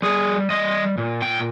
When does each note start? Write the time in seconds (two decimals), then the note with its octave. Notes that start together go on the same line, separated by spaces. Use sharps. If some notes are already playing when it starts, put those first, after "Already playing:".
0.02 G3 G#4
0.50 G3 D#5
0.98 A#2
1.22 G5